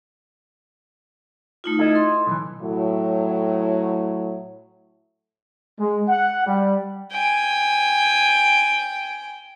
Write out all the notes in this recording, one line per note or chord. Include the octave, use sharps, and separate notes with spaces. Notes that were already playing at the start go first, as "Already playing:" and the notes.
A3 D#4 F4
E4 A4 D#5
C6
B1 E3
A2 F#3
G#3
F#5
G3
G5 G#5